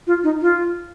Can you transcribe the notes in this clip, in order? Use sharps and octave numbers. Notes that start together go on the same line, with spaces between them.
F4
D#4
F4